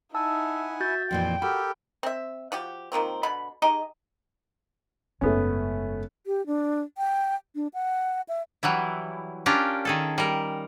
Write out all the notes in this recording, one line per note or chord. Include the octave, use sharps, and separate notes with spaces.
D#4 E4 E5 F#5 G#5 A5 E6
F#4 E5 G6 A6
F2 A#2 E3 G5
F#4 G4 A4 A#4 B5 F6
C4 E5
F3 F#4 G4
D#3 F3 A#3 C4
B2 D3 B5
D#4 G4 G#4 D#5
F#1 G#2 A3 B3 C#4
G4
D4
G5
D4
F#5
E5
E3 F#3 G3 E4
C#4 D4 F4 G4 A#4 D5
D#3 G#4 A4
G3 A#4